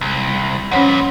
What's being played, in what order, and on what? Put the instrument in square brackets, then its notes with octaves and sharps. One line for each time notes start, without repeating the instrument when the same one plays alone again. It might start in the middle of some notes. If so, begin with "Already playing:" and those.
[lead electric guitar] C2
[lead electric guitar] F2 A#2 [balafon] C#4 C#5 F#5